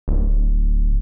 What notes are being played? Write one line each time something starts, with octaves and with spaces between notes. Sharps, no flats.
D1